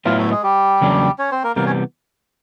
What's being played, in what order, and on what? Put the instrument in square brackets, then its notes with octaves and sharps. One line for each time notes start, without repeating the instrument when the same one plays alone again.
[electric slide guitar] A2 F#3 B3 E4 [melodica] F4
[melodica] A3 A4
G#3 G#4
G3 G4
[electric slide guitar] E2 C#3 F#3 A#3 D4
[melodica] C#4 C#5
C4 C5
A#3 A#4
[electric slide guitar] C3 E3 G3 B3 [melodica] A#3 A#4
[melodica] C#4 C#5